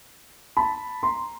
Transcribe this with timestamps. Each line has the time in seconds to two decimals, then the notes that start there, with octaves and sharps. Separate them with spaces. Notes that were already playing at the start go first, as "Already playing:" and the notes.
0.57 A5 B5
1.03 A#5 C6